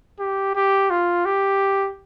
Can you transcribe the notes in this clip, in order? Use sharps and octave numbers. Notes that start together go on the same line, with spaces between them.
G4
G4
F4
G4